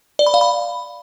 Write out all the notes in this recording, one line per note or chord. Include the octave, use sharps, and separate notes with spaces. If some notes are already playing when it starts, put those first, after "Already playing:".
D5
B5
F5
B5